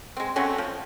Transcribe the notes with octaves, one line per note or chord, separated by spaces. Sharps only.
G#3 C4
F#3 A3 C4 C#4
F3